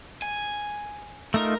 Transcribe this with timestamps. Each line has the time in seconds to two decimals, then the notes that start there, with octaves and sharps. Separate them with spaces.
0.22 G#5
1.34 A3 D#4 F4 A#4